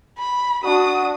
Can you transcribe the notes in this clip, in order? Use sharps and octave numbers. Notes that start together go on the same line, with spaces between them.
B5
D4 F#4 D#6